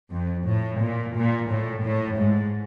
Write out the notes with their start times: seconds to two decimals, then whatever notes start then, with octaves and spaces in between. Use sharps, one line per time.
0.12 F2
0.47 A2
0.82 A#2
1.16 A#2
1.50 A2
1.84 A2
2.19 G#2